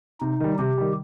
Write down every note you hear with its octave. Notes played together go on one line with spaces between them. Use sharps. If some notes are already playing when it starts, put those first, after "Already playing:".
C3 D#4
D#3 G3
C3 G4
D#3 G3